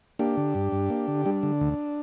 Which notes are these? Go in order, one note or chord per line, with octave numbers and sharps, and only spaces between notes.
A#3 D4 G4
D3
G2
G2
A#3
D3
G3 D4
D3
D2